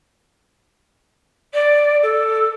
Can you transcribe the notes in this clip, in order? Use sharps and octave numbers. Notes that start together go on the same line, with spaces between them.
D5
A4